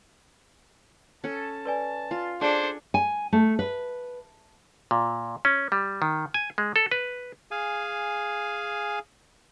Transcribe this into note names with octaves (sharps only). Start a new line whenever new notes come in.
C#4 A4 A5
B4 D5 G#5
F4
D4 G#4 A4 C5 D5 G#5 D7
G#5
A3
B4
A#2
C#4
G3
D#3
G#5
G#3
A4
B4
G#4 F5 G#5